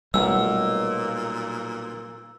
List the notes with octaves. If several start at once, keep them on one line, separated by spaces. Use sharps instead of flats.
B1 A#2 G3 A3 E6